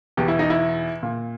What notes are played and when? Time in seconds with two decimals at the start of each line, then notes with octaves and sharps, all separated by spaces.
0.17 E2 B2 G4
0.28 E4
0.39 D#4
0.50 E4
1.03 A#2